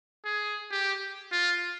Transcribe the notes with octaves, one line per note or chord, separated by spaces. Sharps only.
G#4
G4
F4